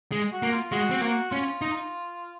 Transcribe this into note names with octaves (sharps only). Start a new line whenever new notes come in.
G#3
F#4
A#3
F4
G#3 F#4
C4
A#3 F#4
C#4 F4
D#4